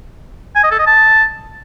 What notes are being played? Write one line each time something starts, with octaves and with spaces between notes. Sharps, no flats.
G#5
D#5
A4
D#5
A5